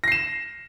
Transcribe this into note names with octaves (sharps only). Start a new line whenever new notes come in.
A#6 C7 E7